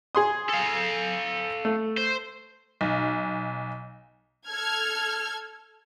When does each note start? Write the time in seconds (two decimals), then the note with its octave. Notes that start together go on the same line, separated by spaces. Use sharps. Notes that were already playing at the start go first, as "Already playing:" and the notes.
0.15 G#4 C6 D#6
0.49 A4 F5
1.65 A3
1.97 C5
2.81 B1
4.47 A4 F6 G#6